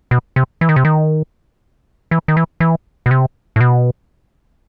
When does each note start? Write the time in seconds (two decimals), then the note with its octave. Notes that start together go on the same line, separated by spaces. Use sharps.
0.11 B2
0.36 C3
0.61 E3
0.69 D#3
0.76 C3
0.85 D#3
2.11 E3
2.28 D#3
2.37 E3
2.60 E3
3.06 B2
3.11 C3
3.56 A2
3.61 B2